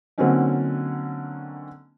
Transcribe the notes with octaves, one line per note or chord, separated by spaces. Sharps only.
D3 F#3 A#3 C4 C#4 D#4